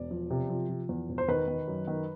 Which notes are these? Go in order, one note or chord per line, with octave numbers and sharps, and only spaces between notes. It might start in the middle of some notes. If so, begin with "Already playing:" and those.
Already playing: E1 D5
F3
C3
F3
F3
E2
E1
C5
D#3 B4
D#3
F#2
D#3